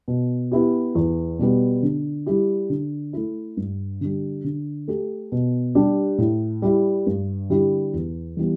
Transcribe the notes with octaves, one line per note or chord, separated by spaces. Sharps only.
B2
B3 E4 G4
E2
B2 G3 B3
D3
G3 E4 G4
D3
A3 E4
G2
D3 G3
D3
A3 G4
B2
G3 D4 G4
A2
G3 E4
G2
D3 G3 E4 G4
E2
E3 G3 B3